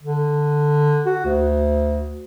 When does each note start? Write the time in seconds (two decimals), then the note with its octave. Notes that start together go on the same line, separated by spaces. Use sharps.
0.03 D3
1.06 F#4
1.25 D2